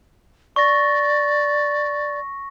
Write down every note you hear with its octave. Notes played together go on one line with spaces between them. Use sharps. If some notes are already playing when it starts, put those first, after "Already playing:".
D5 C#6 A#6